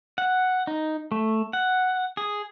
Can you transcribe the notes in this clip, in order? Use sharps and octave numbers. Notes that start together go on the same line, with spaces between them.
F#5
D#4
A3
F#5
G#4